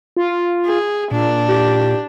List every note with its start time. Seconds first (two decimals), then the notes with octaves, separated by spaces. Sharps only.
0.17 F4
0.66 G#4
1.11 A#2 D4
1.49 G4